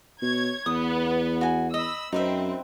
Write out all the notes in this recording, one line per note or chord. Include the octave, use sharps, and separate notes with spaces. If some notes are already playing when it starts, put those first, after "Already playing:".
B2 C#5 G#6
E2 B3 D#6
F#4 G#5
D#5 B5 E6
F#2 C4 D#4 B4 E5